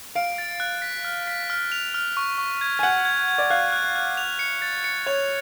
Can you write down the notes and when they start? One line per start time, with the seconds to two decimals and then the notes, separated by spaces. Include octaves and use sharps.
0.15 F5 D7
0.38 A6
0.60 F#6
0.82 B6
1.05 F6
1.27 B6
1.50 F6
1.72 F7
1.94 F6
2.17 C#6
2.38 C#6
2.61 G#6
2.79 G#5
2.83 F#5 G#6
3.05 G#6
3.28 G#6
3.38 D5
3.50 F5 F#6
3.72 F#6
3.95 F#6
4.17 F7
4.39 C#7
4.62 A6
4.84 C#7
5.06 C#5 F7